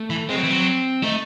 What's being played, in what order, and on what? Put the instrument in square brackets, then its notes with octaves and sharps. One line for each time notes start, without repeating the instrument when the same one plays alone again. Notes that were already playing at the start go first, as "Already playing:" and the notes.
Already playing: [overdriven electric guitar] A3
[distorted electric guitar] E3
[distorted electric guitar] G#3 [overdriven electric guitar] C4
[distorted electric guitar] F#3
E3
F#3
[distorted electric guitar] A3 [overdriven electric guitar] D#4